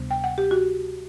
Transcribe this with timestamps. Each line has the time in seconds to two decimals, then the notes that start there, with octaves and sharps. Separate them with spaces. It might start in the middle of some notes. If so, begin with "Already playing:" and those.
Already playing: D2 C3 G3 B3
0.11 G5
0.24 F#5
0.38 G4
0.51 F#4